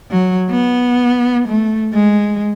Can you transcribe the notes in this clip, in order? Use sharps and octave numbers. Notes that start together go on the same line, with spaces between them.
F#3
B3
A3
G#3